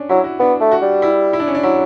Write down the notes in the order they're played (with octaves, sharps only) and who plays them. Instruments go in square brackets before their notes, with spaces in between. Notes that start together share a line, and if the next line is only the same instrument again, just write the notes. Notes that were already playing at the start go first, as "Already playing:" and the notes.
Already playing: [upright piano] C#4 D4
[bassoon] F#3 [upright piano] E4
[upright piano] F#4
[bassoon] B3 [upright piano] D4
[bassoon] A3
[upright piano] F#4
[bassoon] G3
[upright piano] E4
E4
D4
C#4
D4
[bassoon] F#3 [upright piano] E4